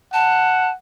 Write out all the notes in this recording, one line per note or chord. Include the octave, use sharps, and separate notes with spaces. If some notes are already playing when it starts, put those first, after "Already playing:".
F#5 A5